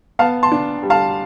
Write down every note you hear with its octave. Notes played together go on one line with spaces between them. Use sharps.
B3 F5 A5
A5 C6
D4
G3
F5 A5